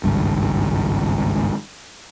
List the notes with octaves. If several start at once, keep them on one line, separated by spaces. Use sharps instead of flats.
G#1 C#2 G2